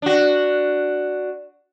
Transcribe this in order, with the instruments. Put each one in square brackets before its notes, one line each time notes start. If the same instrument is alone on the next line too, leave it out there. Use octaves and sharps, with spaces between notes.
[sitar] D4 F#4